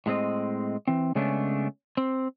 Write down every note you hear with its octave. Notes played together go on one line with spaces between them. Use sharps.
A2 G#3 C4 D#5
E3 C4
C#3 G#3 A3 B3 C#4 D4
C4